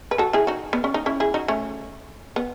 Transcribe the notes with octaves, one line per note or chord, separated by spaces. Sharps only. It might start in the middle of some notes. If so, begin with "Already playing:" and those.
B4
F#4 A4
E4 G#4
D#4 F#4
B3
C#4
D#4
C#4 E4
E4 G#4
D#4 F#4
A3 C#4
B3